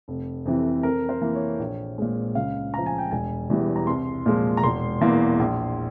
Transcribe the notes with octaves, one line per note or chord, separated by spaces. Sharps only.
F1
F2 C3 E3
F2 A#4
C5
E3 A#3
C#5
A#1
A#2 G#3
C#2 F5
C#3 F3 A#5
G#5
G5
E1 G#5
E2 E3 G3
A#5
C2 C6
A#2 F3 G#3
A#5
E1 C6
E2 E3 A#3
A#1